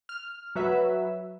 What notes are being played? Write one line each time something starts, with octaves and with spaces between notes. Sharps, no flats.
F6
F#3 F#4 B4 E5